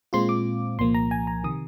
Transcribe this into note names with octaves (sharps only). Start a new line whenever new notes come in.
A#2 G#3 C4 F4 C6
D6
C2 A#2 F3 A#3 C6
A#5
G#5
A#5
C3 D#3 D#6